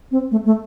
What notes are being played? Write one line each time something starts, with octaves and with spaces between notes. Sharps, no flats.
C4
A3
A3